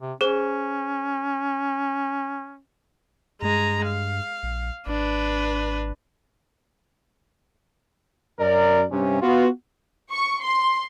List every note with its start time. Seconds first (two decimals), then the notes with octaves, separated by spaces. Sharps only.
0.02 C3
0.21 C#4 G#4 C5
3.42 G2 G#3 A#5
3.87 F5
4.43 A#1
4.87 G#1 D4 B4
8.40 F#2 A#4 D5
8.91 G2 C3 C#4
9.22 B3 F4 F#4
10.11 C#6
10.42 C6